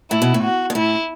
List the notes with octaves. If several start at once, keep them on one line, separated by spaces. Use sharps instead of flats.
A2 E4
B2
A2
F#4
B2
A2 E4